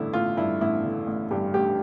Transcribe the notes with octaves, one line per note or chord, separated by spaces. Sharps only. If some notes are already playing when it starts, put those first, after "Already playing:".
Already playing: A1 G2 D3 E4
A1 F4
G2 E4
A1 E4
D3
A1
G2 G4
A1 G4